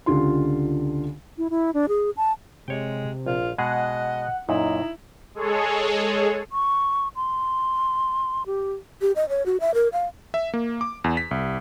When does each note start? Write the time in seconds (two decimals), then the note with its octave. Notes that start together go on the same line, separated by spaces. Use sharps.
0.06 C#2 D3 F4 G4 C6
1.38 E4
1.50 E4
1.74 D4
1.88 G#4
2.17 A5
2.68 C3 G#3 C#5 G5
3.26 A#1 F4
3.58 B2 G#3 G#4 D#5 F#5
4.49 F#2 A#2 D#4 E4
5.34 G#3 G#4 A4 C#5
6.52 C#6
7.16 C6
8.46 G4
9.02 G4
9.16 D#5
9.29 C#5
9.46 F#4
9.60 E5
9.74 A#4
9.93 F5
10.34 E5
10.54 A#3
10.81 D6
11.04 E2
11.17 B6
11.31 C2